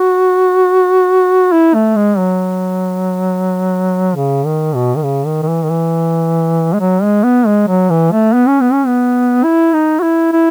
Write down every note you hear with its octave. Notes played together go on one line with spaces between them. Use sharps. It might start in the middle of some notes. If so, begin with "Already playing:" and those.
Already playing: F#4
E4
A3
G#3
F#3
C#3
D#3
B2
D#3
C#3
D#3
D#3
E3
D#3
E3
G#3
F#3
G#3
B3
G#3
F#3
E3
A3
B3
C#4
B3
C#4
B3
E4
D#4
F#4
E4
E4